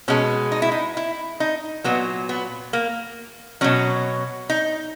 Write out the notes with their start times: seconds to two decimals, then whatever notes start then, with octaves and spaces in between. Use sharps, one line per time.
0.08 B2 G#3 C#4
0.52 D#4
0.62 E4
0.72 D#4
0.97 E4
1.40 D#4
1.84 A#2 F#3 B3
2.29 B3
2.73 A#3
3.61 B2 F#3 C#4
4.50 D#4